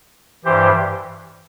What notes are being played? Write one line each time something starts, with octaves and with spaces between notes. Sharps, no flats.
G2 E3 G4 C5